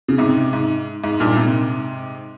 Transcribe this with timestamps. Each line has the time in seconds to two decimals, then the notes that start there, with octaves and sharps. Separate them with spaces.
0.08 C#3
0.18 G#2 C3
0.53 G#2
1.04 G#2
1.20 G2 A#2
1.36 G#2 C3